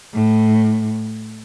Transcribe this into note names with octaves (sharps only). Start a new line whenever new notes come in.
A2